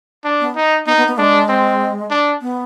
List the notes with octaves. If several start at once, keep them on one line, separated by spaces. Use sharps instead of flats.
D4
B3
D#4
B3 D#4
B3
B3
G#3 D4
C4
D4
B3